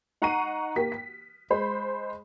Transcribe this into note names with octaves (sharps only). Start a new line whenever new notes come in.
D#4 F#5 A#5 C#6 C7 D#7
A#3 G4 B6
B6
G#3 C5 B5